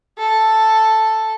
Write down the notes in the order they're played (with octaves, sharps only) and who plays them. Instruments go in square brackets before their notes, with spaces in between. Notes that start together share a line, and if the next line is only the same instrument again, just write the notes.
[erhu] A4